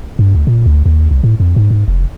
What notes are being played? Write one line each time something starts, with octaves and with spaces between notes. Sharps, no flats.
G2
D2
A#2
D2
D#2
C2
A2
F2
G#2
G#2
F1